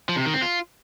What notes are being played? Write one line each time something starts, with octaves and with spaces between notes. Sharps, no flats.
F3
C3
D#3
C4
F4